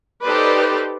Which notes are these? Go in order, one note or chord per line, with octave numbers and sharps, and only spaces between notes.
D#4 G4 A4 B4 C5 D5